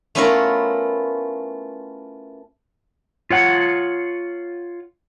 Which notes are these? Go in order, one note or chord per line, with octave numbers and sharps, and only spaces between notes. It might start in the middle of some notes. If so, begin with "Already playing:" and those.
A3 B3 C#4 E4 F4 A#4
F4 C#5 F#5